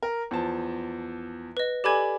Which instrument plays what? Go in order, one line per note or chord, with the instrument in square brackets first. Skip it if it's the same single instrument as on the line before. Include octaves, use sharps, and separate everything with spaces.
[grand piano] A#4
E2 F3 A5
[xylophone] B4 D#5
[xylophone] G4 A4 G#5 [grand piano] D5 B5 G#6